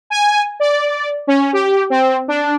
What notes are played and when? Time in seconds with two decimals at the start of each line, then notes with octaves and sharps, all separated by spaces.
0.10 G#5
0.60 D5
1.27 C#4
1.53 G4
1.90 C4
2.28 D4